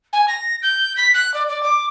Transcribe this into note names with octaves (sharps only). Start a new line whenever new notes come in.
G#5
A#6
G6
B6
F#6
D5
D5
D6